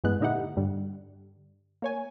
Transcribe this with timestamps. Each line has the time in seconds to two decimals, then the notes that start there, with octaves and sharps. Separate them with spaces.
0.04 G2 E3 G#3 B3 F#6
0.20 A#2 D3 D#4 E4 G4 F#5
0.57 G2 D3 G3
1.82 A#3 C#5 G#5